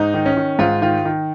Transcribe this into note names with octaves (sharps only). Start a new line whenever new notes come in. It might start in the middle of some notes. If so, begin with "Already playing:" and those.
Already playing: G#2 D#4
D#3
C#4
D#3
G#2 F4
D#3 F4
D#3